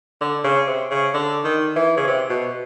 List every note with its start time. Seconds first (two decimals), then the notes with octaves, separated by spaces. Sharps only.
0.21 D3
0.44 C#3
0.67 C3
0.91 C#3
1.14 D3
1.44 D#3
1.76 E3
1.97 C#3
2.07 C3
2.30 B2